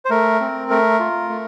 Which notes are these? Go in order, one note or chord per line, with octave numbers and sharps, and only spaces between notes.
C5
A3 A#4
C4
A3 A#4
F4
A3